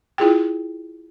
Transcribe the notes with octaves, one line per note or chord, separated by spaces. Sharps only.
E4 F4 G#4 G5